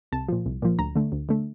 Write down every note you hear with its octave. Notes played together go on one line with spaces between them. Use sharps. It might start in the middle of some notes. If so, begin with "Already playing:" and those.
C2 A5
A#2 F3
C2
A#2 F3
D2 A#5
D3 A3
D2
D3 A3